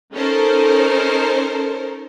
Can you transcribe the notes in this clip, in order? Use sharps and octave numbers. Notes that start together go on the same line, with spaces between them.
C#4 D#4 A4 A#4 C5